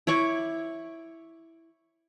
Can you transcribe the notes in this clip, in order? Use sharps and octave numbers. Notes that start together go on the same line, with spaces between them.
E4 C#5 C#6 D6